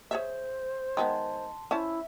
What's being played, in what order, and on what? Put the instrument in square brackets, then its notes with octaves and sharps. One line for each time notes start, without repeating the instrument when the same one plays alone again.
[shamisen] G#4 C#5 E5 [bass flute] C5
[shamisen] D#3 G#3 B3 [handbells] A5 C6
[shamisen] C#4 C5 A5 [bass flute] E4 [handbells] E5